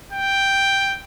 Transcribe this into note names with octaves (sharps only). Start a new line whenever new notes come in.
G5